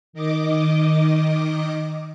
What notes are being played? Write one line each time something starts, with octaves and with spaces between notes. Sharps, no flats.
D#3 D#5 D6